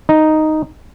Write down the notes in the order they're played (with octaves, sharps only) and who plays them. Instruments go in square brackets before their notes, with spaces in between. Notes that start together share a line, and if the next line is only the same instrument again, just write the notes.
[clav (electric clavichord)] D#4